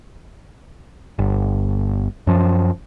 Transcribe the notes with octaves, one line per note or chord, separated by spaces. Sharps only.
G1
F#2 F3